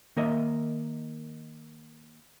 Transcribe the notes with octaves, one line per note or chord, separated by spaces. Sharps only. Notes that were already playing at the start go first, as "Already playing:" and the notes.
D#3 A#3 A#4 D#5 E5